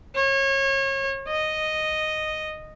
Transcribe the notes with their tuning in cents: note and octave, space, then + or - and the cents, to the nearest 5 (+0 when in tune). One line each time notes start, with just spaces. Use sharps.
C#5 -30
D#5 -5